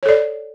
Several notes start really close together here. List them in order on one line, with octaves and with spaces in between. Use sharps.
C#5 A4 D5